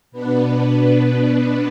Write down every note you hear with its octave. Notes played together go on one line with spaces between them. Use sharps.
B2 B3 D4 B4